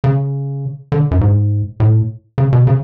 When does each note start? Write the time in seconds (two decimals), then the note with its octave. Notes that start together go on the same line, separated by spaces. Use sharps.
0.04 C#3
0.92 D3
1.11 F#2
1.21 G#2
1.80 A2
2.38 C#3
2.53 B2
2.67 C#3